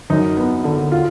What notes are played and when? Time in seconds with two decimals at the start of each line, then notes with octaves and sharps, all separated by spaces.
0.10 F#2 D#4
0.37 B3
0.64 D3
0.92 F4